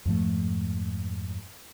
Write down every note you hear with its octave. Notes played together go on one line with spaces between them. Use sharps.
F2 G#2 F3 A3